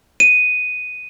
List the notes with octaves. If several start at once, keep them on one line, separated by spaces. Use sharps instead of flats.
D#7